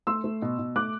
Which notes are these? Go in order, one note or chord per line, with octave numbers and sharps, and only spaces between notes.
A3 C6 E6
A3
B2
B2
A3 D6 F#6